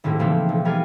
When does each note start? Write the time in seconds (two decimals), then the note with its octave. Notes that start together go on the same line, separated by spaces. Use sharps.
0.04 D#1 A#1 A2 D#3 A#3 E4
0.19 C#3 E3 F3 A3 A#3 C4
0.49 B1
0.65 G3 B3 A#4 F5 G#5